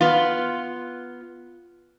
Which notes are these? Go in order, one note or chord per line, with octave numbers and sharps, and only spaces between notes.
B3 F4